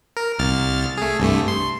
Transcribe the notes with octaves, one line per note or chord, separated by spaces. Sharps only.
A#4
C2 F6 A6
A3 G#4
C2 G2 A3
C6